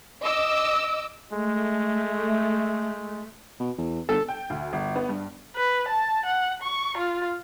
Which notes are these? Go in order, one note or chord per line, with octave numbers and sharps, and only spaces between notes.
D#5 D6 E6
G#3 A3
B2
E2
G1 A4 A5
G5
D2
G1
B3
G2
B4
A5
F#5
C#6
F4